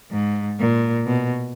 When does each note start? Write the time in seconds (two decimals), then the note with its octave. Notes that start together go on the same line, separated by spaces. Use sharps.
0.12 G#2
0.60 A#2
1.07 B2